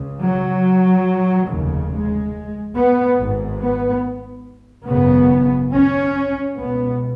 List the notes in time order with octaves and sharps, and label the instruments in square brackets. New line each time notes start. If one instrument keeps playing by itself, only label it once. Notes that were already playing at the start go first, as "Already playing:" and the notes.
Already playing: [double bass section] C#2 C#3
F#3
F1 D#2 C#3
G#3
B3
G#1 G#2
B3
G#1 F#2 C#3 B3
C#4
C#2 B2 B3